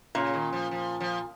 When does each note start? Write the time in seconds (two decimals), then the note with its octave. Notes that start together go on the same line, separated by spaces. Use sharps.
0.15 A#2 C#3
0.33 D#3
0.52 F3
0.71 F3
1.00 F3